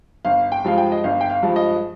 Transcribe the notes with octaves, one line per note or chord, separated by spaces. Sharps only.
G1 F5
G5
G2 F3 G#3 F5
G5
D#5
G1 F5
G5
F5
G2 F3 G#3
D#5